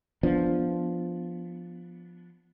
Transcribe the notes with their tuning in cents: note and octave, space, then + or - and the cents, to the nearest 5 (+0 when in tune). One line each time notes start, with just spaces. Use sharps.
F3 +0 B3 +0 D4 +0